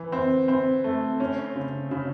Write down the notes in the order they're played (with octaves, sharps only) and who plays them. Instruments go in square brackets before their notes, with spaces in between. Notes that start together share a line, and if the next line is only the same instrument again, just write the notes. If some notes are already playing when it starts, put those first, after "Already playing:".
Already playing: [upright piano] E3
C4
C4
A3
C#4
C#3
C#3